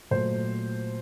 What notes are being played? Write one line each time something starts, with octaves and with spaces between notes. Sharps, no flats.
A#2 F#3 A3 C5